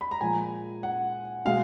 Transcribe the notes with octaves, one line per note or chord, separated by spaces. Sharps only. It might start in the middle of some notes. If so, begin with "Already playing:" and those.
B5
A#5
A#2 F3 G#3 G#5
F#5
B2 G#3 F5